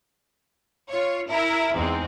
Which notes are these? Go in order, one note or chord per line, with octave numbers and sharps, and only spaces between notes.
F4 C#5
E4 A#4
E2 G#2 G#3 C4